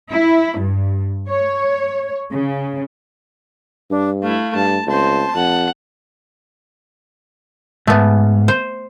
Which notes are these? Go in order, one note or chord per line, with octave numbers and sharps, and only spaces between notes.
E4
G2
C#5
C#3
G2 D4
A3 E4 F5
G2 A5
C#2 C4 C5 A5
F2 F#5
G#2 A3 B3
C5